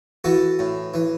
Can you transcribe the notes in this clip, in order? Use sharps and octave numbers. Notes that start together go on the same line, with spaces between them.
E3 F#4 A4
A2
E3